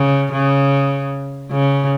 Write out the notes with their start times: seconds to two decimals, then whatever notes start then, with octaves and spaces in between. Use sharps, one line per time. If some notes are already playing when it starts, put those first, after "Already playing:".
Already playing: C#3
0.33 C#3
1.51 C#3